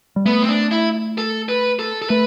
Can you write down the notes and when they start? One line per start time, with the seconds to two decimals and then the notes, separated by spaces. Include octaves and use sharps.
0.16 G3
0.25 A3 B3
0.44 C4
0.49 D4
0.71 E4
1.18 A4
1.49 B4
1.79 A4
2.02 A4
2.10 A3 B4